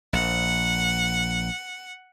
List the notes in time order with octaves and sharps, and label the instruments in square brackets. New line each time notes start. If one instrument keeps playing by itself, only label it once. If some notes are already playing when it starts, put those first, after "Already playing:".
[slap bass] A#1 [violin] F#5